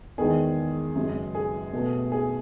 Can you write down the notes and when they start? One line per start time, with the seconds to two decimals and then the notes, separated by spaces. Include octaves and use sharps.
0.18 E2 D#3 G#3 G#4
0.95 F#2 C#3 G#3
1.35 G#4
1.73 B2 A3
2.12 G#4